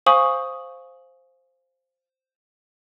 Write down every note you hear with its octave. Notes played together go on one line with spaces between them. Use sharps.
C5 F5 G#5 C#6 D#6 F#7